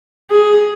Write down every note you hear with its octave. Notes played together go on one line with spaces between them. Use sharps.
G#4